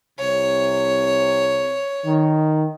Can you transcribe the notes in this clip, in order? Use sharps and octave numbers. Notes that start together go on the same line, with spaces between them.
C2 C3 C#5
D#3